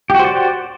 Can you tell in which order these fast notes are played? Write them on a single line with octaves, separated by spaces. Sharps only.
G4 F#4 C5 D5